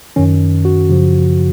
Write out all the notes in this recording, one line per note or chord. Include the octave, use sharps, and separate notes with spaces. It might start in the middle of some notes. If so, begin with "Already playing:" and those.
F#2 D#3 C#4
F#4
F#2 C#3 F3